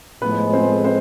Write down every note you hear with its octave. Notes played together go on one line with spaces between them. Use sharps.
A2 F3 G#3 B3 B4
C4 C5
C4 C5